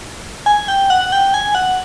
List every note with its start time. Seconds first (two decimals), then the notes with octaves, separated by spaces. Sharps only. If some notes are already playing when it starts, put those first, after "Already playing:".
0.46 G#5
0.68 G5
0.90 F#5
1.12 G5
1.34 G#5
1.55 F#5